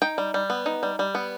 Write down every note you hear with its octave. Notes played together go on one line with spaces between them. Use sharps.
D#4 G5
G3
G3
B3
D#4
G3
G3
B3